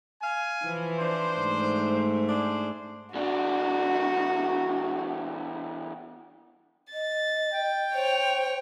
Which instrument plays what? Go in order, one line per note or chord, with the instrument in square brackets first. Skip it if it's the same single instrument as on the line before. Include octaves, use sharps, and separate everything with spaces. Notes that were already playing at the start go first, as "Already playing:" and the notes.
[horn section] F5 G#5
[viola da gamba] E3 F3 E4
[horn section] D4 C5
[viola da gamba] G#2 A3
[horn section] D4 G#4 C5
[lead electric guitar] E2 D4 [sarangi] F#4
[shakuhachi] D#5 [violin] A6
[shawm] G5
[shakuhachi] C5 [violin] C#5 F7